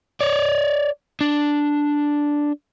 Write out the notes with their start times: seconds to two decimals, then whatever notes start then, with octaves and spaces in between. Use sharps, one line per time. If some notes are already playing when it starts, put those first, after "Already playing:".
0.21 C#5 D5
1.21 D4